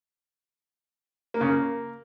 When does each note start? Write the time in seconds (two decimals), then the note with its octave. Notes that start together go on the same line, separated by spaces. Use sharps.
1.34 A#3
1.41 C#3
1.48 A#3